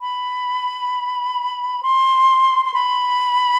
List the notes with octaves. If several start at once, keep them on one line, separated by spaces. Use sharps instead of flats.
B5
C6
C6
B5